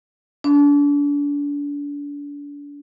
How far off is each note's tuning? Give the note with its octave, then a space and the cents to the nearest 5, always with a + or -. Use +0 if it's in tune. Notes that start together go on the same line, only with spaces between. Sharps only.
D4 -35